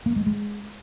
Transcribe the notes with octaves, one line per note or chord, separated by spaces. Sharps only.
A#3
G#3
G#3